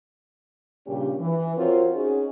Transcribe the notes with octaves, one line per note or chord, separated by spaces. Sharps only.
G2 A#2 C#3 C#4 G4
E3
C4 F4 F#4 A#4 C5 C#5
C#4 D#4 F#4 G#4